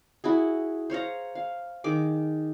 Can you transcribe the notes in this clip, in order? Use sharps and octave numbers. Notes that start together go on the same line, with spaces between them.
E4 F#4 G#4
C5 C#5 F5 A#5
F5
D#3 G#4 D6